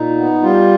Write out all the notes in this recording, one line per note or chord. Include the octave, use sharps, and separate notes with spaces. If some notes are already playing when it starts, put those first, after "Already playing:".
Already playing: A#2 D#4
B3
G3 F4